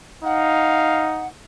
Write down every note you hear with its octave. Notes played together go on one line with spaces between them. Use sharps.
D#4 F5 F#5